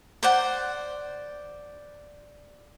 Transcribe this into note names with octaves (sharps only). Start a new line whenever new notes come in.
C5 D5 F#5